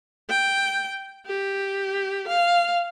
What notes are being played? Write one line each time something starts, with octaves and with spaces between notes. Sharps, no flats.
G5
G4
F5